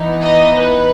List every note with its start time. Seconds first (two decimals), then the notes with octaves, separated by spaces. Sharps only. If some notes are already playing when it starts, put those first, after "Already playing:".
Already playing: E3 B3 D#4
0.20 D#5
0.58 B4